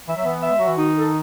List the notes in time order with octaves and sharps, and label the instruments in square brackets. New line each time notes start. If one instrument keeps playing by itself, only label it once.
[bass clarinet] E3 [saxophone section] E5
[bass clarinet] F#3
[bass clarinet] E3 [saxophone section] B3
[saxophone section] E5
[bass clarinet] G#3
[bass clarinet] F#3 [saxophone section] F#4
[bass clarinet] E3
[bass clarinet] D#3 [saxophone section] D#4
[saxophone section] A4